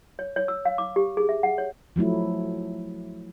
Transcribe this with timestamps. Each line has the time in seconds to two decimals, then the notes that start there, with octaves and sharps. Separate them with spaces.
0.19 C#5
0.36 C#5
0.48 E6
0.65 F5
0.78 D6
0.96 G4
1.17 G#4
1.29 E5
1.43 F#5
1.58 C#5
1.96 F3 F#3 A3 E4